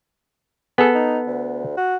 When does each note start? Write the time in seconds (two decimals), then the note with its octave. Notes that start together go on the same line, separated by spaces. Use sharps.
0.78 B3 G#4 A4
0.95 D#4
1.27 D2
1.77 F#4